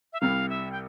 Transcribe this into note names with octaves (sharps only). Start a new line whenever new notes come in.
E5
C2 C3 G3 F5
E5
G5